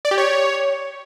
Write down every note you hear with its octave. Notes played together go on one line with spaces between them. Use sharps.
D5
G4
C#5